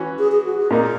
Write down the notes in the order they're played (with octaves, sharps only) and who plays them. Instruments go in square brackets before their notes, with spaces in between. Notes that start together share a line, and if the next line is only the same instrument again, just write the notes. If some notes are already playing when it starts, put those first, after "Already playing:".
Already playing: [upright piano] E3 C#4 F#4
[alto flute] G#4
G#4
F#4
G#4
[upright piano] A#2 A#3 D#4 [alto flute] A#4